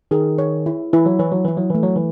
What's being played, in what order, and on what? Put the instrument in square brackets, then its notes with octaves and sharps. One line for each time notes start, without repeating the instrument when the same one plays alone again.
[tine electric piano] D#3 [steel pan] G#4
[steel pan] C#5
E4
[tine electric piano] E3 [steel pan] E4
[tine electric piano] F#3
[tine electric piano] E3 [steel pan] C#5
[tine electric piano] F#3
[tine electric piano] E3 [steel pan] E4
[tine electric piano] F#3
[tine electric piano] E3 [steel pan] A3
[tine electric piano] F#3
E3